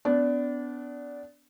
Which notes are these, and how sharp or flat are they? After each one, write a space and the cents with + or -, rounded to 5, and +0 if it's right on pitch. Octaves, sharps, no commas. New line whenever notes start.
B3 +20 D4 -20